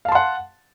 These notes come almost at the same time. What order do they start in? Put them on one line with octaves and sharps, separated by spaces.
F5 A5 C6 F#5